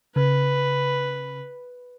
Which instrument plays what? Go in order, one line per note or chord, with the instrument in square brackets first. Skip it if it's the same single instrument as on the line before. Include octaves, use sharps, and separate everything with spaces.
[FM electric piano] C#3 [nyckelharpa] B4